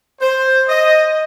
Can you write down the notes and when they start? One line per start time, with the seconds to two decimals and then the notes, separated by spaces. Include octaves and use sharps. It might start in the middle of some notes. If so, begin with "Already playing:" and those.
0.21 C5
0.68 D#5